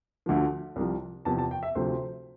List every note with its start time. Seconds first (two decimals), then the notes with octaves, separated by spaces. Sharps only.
0.26 D2 D3 F3
0.76 C2 C3 F3
1.25 E2 C3 F3 A5
1.38 A5
1.51 G5
1.63 E5
1.75 D2 C3 F3 C5